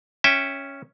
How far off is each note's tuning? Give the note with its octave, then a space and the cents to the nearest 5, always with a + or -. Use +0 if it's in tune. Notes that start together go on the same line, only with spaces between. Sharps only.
C#4 +0 E5 -10 G5 +25